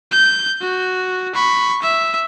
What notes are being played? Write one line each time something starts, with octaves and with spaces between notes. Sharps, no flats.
G6
F#4
B5 C#6
E5